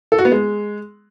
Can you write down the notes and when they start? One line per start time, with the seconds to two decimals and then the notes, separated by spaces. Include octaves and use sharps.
0.12 A4
0.18 F#4
0.25 B3
0.32 G#3